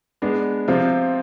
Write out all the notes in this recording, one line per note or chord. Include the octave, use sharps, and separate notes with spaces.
G#3 B3 D4
C3 F3 C4 F4